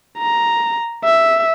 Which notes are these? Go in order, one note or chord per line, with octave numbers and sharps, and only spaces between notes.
A#5
E5